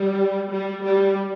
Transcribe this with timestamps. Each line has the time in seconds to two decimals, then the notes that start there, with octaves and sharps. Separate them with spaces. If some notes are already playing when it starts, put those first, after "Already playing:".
Already playing: G3
0.50 G3
0.84 G3